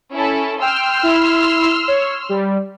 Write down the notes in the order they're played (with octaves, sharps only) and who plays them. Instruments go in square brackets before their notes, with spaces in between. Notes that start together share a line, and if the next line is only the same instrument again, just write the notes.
[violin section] C#4 E4 A4
[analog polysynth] G5 [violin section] C6 E6 F6
[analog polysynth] E4
C#5
G3